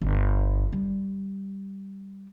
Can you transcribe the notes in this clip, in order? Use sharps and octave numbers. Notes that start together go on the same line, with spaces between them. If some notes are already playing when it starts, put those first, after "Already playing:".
G1
G3